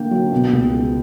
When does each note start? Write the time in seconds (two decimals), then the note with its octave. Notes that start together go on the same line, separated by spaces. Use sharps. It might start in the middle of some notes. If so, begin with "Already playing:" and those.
Already playing: D3 A#3 G5
0.11 F#3
0.32 B2
0.53 C#2
0.74 G#3